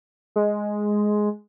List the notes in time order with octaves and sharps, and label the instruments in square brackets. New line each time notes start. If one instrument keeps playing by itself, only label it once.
[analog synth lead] G#3